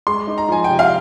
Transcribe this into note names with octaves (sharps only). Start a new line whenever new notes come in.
G#3 C6
D#4
A#5
F3 G#5
G5
C3
F5